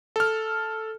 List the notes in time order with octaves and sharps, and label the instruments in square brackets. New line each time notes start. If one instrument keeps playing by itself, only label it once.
[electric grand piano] A4 F6